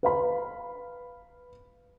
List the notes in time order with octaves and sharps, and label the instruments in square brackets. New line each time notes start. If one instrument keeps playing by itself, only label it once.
[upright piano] B4 F5 B5